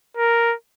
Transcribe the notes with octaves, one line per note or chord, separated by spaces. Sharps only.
A#4